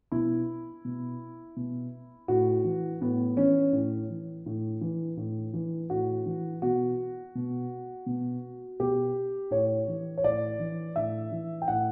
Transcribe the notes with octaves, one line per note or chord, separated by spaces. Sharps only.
B2 E4
B2
B2
A2 F#4
E3
A2 B3
E3 C#4
A2
E3
A2
E3
A2
E3
A2 F#4
E3
B2 F#4
B2
B2
B2 G4
A2 C#5
E3
C#5
A2 D5
E3
A2 E5
E3
G5
A2 F#5